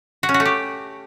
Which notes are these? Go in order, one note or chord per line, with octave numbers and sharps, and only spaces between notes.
F#4
C#4
F#4
A3
G4